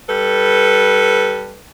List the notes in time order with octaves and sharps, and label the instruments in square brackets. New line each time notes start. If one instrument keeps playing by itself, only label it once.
[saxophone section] G3 A4 B4